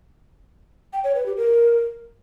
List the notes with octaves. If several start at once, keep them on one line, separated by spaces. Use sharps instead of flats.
G5
C#5
B4
G4
A#4